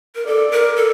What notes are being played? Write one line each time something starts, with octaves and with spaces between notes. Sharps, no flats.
A#4
A4 D5
A#4
A4